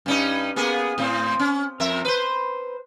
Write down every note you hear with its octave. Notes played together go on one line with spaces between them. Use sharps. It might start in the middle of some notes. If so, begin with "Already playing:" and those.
G2 C#4 D#4
A#3 B3 G#4
A2 C4
C#4
F2 A#4 E5
B4 C5